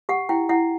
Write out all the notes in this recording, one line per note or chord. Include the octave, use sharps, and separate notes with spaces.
G4 F#5
E4 G5
E4 F#5